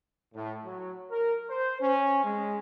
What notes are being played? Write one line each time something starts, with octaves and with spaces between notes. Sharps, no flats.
A2
F#3
A#4
C5
C#4
G#3